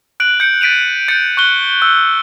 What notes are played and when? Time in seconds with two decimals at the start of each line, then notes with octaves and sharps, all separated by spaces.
0.20 F#6 D7 F#7
0.40 G6 C#7 D7
0.61 A6 B6 D7 D#7 F7
1.08 G6 A6 C#7 D7
1.37 C#6 F#6 G7
1.82 E6